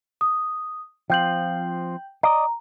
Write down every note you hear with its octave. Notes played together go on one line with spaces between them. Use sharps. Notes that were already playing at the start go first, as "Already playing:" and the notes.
D#6
F3 C4 F4 G5 G6 F#7
D5 D#5 A#5